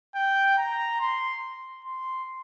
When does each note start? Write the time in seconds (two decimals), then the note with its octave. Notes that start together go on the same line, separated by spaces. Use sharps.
0.15 G5
0.58 A#5
1.00 C6
1.85 C6